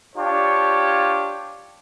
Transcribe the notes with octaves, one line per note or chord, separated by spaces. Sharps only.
D4 F4 G4 C#5